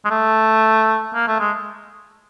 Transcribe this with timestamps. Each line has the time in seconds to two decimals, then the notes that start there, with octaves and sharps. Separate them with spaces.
0.05 G#3
0.10 A3
1.15 A#3
1.28 A3
1.40 G#3